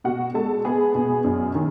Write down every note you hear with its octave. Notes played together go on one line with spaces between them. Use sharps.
B2 F#4 F#5
G#3 A4 A5
B3 G#4 G#5
B2
F#2
D#3